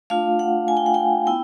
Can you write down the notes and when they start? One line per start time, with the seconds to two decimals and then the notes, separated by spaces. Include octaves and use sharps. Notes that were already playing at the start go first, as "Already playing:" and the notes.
0.10 A3 D4 F4 F5
0.39 F#5
0.68 G#5
0.77 G5
0.86 F#5
0.94 G5
1.26 B3 E4 G5